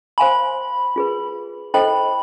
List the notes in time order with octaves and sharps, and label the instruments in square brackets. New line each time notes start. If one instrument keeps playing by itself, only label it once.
[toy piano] C5 F5 G#5 C6 [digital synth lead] B5
[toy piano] F4 G#4 B4
[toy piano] E4 A4 C5 D#5 G5 [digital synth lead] B5